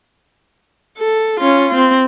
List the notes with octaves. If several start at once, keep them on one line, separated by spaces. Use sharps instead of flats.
A4
C#4 F4
C4